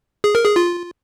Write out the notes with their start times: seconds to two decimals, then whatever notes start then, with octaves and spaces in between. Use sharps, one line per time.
0.24 G#4
0.35 A#4
0.45 G#4
0.56 F4